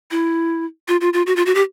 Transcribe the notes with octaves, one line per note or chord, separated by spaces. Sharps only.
E4
F4
F4
F4
F#4
F4
F#4
G4